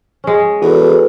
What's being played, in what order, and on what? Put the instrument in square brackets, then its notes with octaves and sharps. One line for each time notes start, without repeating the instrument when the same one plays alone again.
[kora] G#3 C#4
[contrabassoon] E2 [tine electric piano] F#4 A4 B4